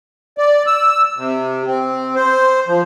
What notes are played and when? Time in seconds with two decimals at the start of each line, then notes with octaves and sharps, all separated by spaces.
0.38 D5
0.67 E6
1.17 C3
1.67 C4
2.15 C5
2.68 F3